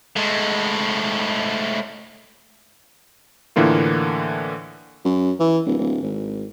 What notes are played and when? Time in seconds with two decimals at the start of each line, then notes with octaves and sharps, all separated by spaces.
0.16 A2 G#3
3.56 A2 D3 E3 A#3 F4
5.05 F#2
5.40 E3
5.66 D1
5.79 D1
6.02 G#1